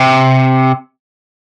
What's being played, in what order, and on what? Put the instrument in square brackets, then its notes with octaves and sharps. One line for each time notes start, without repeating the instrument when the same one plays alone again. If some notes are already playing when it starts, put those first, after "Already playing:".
Already playing: [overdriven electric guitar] C3